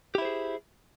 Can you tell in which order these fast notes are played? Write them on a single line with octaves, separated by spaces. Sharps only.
G4 E4 C5 G#4